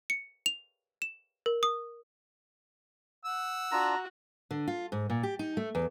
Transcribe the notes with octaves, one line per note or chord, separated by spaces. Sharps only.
C#7
F7
E7
A#4
D#6
F#5 E6
D4 F4 F#4 A#5
D3
F4
G#2
A#2
G4
D#4
A3
E2